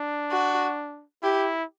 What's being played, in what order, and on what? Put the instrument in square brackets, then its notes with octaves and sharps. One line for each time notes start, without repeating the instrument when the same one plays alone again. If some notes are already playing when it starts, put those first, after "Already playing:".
Already playing: [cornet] D4
[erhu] F#4
[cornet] E4 [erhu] G4